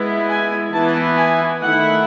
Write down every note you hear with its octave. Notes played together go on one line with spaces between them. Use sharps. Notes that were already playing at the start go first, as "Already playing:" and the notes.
Already playing: G#3 B3 E4
G#5
E3 B3 E4 A5
G#5
D#3 A3 E4 F#5